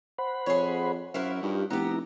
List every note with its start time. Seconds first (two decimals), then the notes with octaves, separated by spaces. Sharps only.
0.18 C5 F#5 B5
0.46 F2 G#4 C#5
1.14 F#2 E4 F#4 A#4 C5 F5
1.42 G2 D#4 F4 G4
1.70 F1 B3 E4 G4 A#5